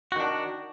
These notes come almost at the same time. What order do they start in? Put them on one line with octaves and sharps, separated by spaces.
F#4 D#3 D4